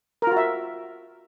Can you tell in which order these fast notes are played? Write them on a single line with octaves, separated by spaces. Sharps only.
A#4 F4 F#4 E5